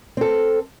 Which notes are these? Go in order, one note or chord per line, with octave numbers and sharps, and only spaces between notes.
C4 A4